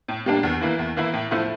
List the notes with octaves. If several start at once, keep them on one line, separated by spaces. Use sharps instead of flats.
A2
G3 A#3 D4
E2
E3 A#3 E4
E2
E3 A#3 E4
A2
F3 A3 E4